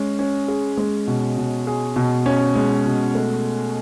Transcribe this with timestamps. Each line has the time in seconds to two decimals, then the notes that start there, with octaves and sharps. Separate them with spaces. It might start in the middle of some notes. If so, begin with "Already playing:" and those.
Already playing: G#3 C#4
0.19 C#4
0.48 G#4
0.77 G#3
1.07 B2
1.38 B2
1.67 G#4
1.96 B2
2.26 C#4
2.55 G#3
2.85 B2
3.15 A3